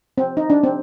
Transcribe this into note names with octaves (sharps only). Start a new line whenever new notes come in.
C4
D#4
D4
C4